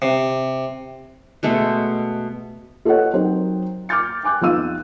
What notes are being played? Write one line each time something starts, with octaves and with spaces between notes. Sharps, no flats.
C3
B2 G#3 A3
F4 A4 B4 C#5 D#5 F#5
F#3 C4 D#4 A#4 C5
D6 F6 G6 A6 C#7
G5 G#5 D6 F#6 G6
F2 B3 D#4 F5 E6 D#7